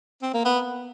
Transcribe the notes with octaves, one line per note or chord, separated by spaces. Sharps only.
C4
A#3
B3